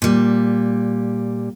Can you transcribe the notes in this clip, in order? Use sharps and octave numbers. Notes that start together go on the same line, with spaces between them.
A#2 G3